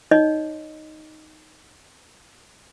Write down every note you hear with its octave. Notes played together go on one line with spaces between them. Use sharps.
D#4 C#5 D#5